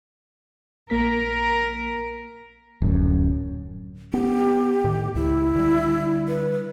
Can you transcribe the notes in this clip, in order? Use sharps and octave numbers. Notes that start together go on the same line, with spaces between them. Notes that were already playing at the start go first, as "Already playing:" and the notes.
A#1 A#3 A#4 B6
D1 F#2
B3 G4
A2 D#3
C#2 E4
D3 G3
B4